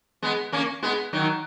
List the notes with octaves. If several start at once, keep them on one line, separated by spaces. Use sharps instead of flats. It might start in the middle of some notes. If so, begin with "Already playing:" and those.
G#3 B3
A#3 C#4
G#3 B3
D#3 F#3